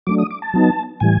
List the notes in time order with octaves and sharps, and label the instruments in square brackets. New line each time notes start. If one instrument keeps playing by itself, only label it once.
[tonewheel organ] F#3 A3 D4 D6
D#6
D6
A5
F#3 B3 D#4
A2 E3 G3 G#5